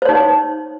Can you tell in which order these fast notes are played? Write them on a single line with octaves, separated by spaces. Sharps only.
C5 C#5 D#4